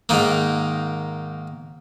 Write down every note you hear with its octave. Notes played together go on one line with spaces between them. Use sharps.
G#2 D#3 A#3